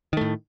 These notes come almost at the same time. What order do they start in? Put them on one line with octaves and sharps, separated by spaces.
D#3 A3 A2